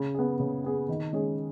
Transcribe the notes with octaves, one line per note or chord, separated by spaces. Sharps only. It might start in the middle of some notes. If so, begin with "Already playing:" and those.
Already playing: C#3
B3 G#4
C#3
B3 G#4
D#3
G#3 C#4 G#4